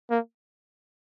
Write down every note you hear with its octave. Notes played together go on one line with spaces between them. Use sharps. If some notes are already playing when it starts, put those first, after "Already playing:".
A#3